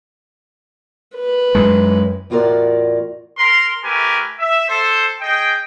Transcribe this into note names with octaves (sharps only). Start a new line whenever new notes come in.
B4
F#2 G#3
E2 A2 F4 F#4 A#4 D5
A#4 C6
A3 G4 A#4 B4 G#5
E5
A4 C5
G#4 D#5 G5